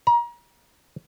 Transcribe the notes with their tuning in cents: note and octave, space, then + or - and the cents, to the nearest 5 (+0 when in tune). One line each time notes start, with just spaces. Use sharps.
A#5 +35